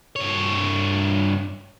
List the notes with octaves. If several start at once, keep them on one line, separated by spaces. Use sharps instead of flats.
G2 C#5